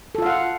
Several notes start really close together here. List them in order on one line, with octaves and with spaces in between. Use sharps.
A4 F4 F5 F#5